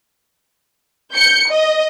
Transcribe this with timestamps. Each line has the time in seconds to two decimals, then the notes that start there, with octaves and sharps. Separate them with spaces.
1.14 G6 C#7
1.51 D#5